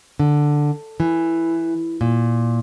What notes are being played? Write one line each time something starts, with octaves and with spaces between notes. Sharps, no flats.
D3
E3
A#2